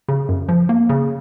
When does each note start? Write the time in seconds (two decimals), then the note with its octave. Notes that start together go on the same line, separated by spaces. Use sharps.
0.09 C#3
0.29 F#2
0.49 F3
0.69 A#3
0.89 C#3